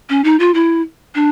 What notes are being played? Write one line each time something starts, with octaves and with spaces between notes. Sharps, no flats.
C#4
D#4
F4
E4
D4